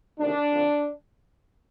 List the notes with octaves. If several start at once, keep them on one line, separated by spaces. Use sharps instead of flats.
D2 C3 D#3 D4
F2 D3